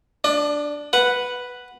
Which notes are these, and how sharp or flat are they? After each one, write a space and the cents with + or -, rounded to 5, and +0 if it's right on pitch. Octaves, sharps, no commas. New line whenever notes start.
D4 +0 D5 +40
B4 +0 F#5 +0